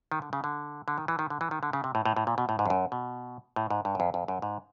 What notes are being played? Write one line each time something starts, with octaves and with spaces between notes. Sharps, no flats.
D#3
D3
C#3
D3
D3
D#3
E3
D#3
D3
E3
D#3
D3
C#3
C3
A2
A2
A2
A#2
B2
A2
G#2
F2
F#2
B2
A2
G#2
G2
F#2
F2
F2
F#2
G#2